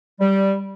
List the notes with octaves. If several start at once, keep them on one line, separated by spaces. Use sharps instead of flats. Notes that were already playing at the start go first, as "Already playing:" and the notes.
G3